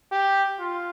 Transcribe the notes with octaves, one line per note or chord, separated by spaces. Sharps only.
G4
F4